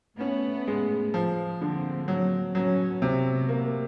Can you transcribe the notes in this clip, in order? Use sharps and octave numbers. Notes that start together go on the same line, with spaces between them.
A3 B3 C#4
G#3
F3
D3 A#3 C4
F#3 A#3 C4
F#3 B3 C#4
C3 A#3 C4
A3 B3
A#3